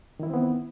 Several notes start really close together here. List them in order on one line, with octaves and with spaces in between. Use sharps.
D#3 E4 E3 C4 B3